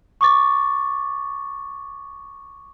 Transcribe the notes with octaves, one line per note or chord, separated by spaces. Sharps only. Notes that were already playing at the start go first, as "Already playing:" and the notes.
C#6 D6 A6